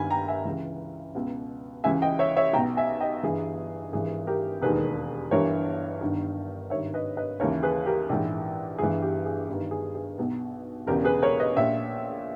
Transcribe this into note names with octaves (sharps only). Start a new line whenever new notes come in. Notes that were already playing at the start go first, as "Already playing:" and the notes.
Already playing: G1 G2 D#3 G#5 B5
G5 A#5
E5 G#5
C#2 C#3 E3
C#2 B2
C#2 C#3 E3 E5 G#5
D#5 G5
C#5 E5
C#5 E5
B1 B2 G5 A#5
E5 G#5
D#5 G5
G1 G2 E3 G#4
G#1 G2 E3 G#4
G4 A#4
E1 D#2 D#3 G#4 B4
G1 G2 E3 A#4 C#5
G1 G2 D#3
G#1 G2 D#3 C#5 E5
B4 D#5
B4 D#5
D#2 C#3 E3 A#4 C#5
G#4 B4
G4 A#4
A#1 G#2 E3
G1 G2 E3 G#4
G4
G#4
G1 G2 D#3
G#4
G#4
B1 B2
E1 E2 C#3 G4 A#4
G#4 B4
A#4 C#5
B4 D#5
A#1 A#2 C#5 E5